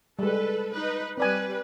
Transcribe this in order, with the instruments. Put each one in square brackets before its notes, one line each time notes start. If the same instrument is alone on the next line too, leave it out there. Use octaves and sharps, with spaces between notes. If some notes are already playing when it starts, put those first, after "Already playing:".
[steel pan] G3 G#3 [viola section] A4 B4
[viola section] D#4 B4
[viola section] G3 B4 [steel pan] C4 D5 G#5